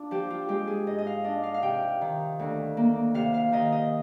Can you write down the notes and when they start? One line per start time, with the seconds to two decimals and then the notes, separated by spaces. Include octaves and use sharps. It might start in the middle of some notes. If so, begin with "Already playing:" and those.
Already playing: D4 F4
0.11 F3 G4
0.30 F4
0.48 G#3 G4
0.67 G#4
0.87 G#2 D#5
0.98 D#5
1.07 F5
1.24 D4 D#5
1.43 F5
1.54 F5
1.62 C3 G5
2.01 D#3
2.39 D2
2.77 A#3
3.14 C3 F5
3.34 F5
3.52 D#3 D#5
3.72 D#5